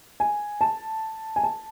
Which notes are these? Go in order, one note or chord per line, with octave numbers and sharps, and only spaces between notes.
G#5
A5
G#5
A5